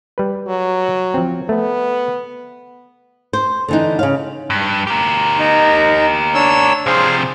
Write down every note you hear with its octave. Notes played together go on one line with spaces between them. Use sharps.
G3 B4
F#3
F3 C4
A3 B3
C5
D3 E3 D#4
C#3 F5
G2
G4 A#4
D#4
D4 C#5 E6
C3 F3 G#4 C5 F5